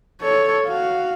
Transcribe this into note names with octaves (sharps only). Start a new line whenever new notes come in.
A4 C#5
F#4 F5